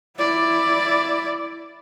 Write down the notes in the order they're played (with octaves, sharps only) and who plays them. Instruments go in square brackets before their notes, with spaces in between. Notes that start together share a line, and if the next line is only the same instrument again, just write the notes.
[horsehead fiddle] E4 D5